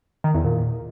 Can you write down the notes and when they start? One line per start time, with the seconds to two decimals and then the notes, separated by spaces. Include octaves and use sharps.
0.24 D#3
0.34 E2
0.45 A#2